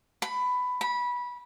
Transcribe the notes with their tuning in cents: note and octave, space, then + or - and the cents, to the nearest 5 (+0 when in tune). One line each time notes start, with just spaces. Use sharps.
B5 +15
B5 -20